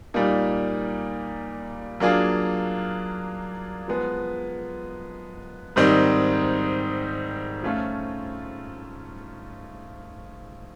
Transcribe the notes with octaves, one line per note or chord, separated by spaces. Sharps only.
A#2 G3 A#3 D#4
F#3 A#3 D4 F4 G#4
F3 G#3 B3
G#2 D#3 G3 C4 D#4
F3 A3 C#4 F4